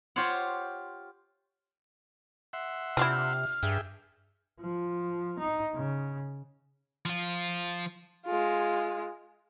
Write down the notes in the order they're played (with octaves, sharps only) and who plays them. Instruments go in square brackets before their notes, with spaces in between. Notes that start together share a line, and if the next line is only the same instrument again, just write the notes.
[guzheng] F4 G4 C5 C#5 F#5
[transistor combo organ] E5 F#5 C6
[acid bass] C3 [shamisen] F3 D4 E4 [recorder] F6
[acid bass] G2 [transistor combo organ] G#4 E5 G5
[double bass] F3
D#4
C#3
[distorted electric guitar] F3 F4
[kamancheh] G#3 F4